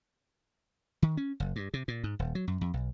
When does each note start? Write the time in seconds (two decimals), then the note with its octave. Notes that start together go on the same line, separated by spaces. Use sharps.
1.02 D#3
1.17 C#4
1.40 F#1
1.56 G2
1.74 C3
1.88 A#2
2.04 G#2
2.19 D#1
2.35 F#3
2.48 F#2
2.61 F2
2.74 B1